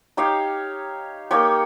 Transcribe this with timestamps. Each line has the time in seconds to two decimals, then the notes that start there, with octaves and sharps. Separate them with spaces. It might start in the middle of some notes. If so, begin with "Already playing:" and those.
0.17 D#4 G4 C#5 F5
1.31 A#3 D#4 G4 C#5